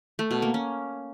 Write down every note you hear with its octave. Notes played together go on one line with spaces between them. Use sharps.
A3
B2
A#3
C#4